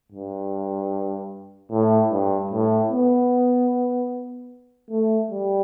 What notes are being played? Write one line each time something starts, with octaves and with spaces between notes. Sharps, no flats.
G2
A2
G2
A2
B3
A3
G3